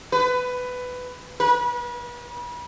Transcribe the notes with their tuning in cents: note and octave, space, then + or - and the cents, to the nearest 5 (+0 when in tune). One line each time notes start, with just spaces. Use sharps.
B4 +15
B4 -35